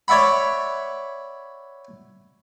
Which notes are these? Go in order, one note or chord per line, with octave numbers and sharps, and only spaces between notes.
C#5 D5 E5 F#5 B5